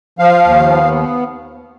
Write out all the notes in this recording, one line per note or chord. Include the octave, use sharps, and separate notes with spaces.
F3 F5
D#2
B3